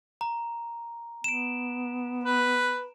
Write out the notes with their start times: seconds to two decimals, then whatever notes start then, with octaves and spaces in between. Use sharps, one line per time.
0.21 A#5
1.24 B3 D7 E7
2.24 B4